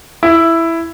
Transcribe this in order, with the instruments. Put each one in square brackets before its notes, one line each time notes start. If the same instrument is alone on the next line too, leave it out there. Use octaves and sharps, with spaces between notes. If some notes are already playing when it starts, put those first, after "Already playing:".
[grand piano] E4